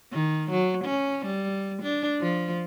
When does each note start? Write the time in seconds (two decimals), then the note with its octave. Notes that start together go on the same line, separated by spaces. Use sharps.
0.12 D#3
0.51 F#3
0.84 C#4
1.26 G3
1.82 D4
2.20 F3